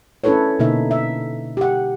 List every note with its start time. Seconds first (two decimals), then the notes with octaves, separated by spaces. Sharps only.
0.24 C#4 D4 E4 A4 B4 C#5
0.59 B2 D3 A#3 D#4 E5
0.91 E5
1.57 G4 F#5